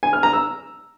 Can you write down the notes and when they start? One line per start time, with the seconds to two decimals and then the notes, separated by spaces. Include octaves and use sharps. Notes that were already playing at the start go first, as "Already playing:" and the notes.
0.03 G#5
0.13 F6
0.23 A#5
0.33 E6